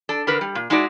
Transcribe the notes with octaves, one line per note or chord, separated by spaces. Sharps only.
D4 A4
D3 A#4 B4
G3
A#2
G#3 D#4 E4 F#4 D5